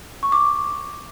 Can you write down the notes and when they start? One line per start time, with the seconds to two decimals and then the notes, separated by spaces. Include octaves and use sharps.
0.23 C#6
0.32 D6